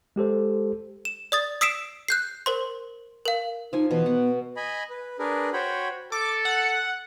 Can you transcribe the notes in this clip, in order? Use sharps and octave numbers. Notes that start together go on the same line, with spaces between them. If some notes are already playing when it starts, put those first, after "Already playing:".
G#3 G4 A4 C5
E7
D5 D#6 A6
D#6 E6 B6 C7 D7 E7
F#6 G6 C7
A#4 C5 C6
A#4 F5
F3 D#4 G#5
B2 E3
B3 F#5
D#5 G#5 B5
B4
D4 G#4 A#4 B4
F#4 C5 C#5 G5 B5
A4 D6
F#5